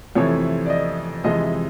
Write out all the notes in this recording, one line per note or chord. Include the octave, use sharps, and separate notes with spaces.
F2 C3 E3 A3 C#5
D5
D#5
F2 C3 E3 G#3 D#5